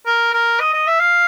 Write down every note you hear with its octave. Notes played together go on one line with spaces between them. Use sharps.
A#4
A#4
D#5
D#5
E5
F5